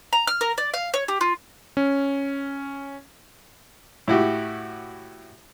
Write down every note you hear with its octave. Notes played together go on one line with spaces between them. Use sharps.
A#5
F6
A#4
D5
F5
C#5
G4
F4
C#4
A2 E4 F#4 G4